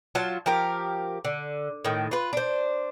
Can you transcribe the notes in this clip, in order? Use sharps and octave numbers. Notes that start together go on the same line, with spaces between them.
F#3 F4 A5
F3 G4 A#4
D3
A2 D#3
F4 B4
D4 C5